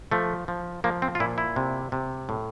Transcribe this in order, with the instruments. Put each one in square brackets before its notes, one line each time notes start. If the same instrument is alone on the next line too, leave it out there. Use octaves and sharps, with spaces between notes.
[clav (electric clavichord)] F3 A3
F3
F3 A#3
C4
F4
A#2 E4
E4
C3
C3
A2